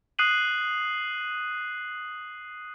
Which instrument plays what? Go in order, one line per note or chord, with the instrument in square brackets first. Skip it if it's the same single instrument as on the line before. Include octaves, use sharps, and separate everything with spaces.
[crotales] D#6 F#6 C7 D#7 F#7